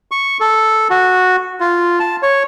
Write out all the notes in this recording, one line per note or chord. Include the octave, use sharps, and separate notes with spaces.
C#6
A4
F#4
F4
A5
C#5